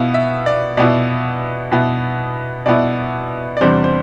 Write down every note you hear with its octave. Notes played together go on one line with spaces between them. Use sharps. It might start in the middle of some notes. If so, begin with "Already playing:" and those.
Already playing: B2 B3 E4 F5
E5
D5
B2 B3 E4 D5
B2 B3 E4
B2 B3 E4 D5
D5
E2 C3 G3 D4 C5
C5